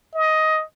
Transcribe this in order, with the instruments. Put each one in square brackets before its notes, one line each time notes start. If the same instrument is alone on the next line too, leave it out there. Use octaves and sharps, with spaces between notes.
[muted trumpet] D#5